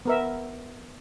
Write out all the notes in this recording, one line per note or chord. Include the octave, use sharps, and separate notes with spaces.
B3 A#4 E5